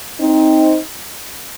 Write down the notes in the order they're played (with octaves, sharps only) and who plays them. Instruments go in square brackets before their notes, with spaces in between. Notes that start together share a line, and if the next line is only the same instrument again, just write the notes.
[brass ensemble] C4 D#4